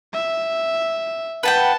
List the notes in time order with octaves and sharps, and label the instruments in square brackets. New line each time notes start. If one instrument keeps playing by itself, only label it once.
[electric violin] E5
[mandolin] B4 F#5 G5 [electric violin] A5